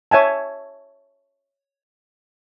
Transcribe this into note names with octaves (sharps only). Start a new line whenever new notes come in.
C#5 E5 G#5 A5